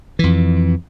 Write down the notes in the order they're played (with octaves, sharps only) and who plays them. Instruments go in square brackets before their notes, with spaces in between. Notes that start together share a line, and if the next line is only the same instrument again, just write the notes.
[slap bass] F2 E3